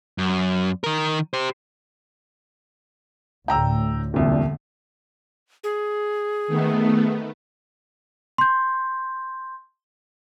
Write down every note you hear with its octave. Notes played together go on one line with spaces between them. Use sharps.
F#2
D#3 A#4
G4 C5
D2 A2 G5 A#5 E6
E1 C2 A#2 D3
G#4
D#3 A3 B3
C6 G6